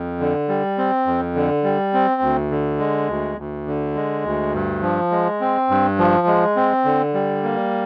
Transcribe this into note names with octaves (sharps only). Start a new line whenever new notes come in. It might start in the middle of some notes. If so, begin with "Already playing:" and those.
Already playing: F2
D3
G3
C4
F2
D3
G3
C4
D2
D3
G#3
D2
D2
D3
G#3
D2
G2
F3
G#3
C4
G2
F3
G#3
C4
D3
G3
A#3